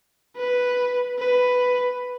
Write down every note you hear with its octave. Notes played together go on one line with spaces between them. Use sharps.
B4
B4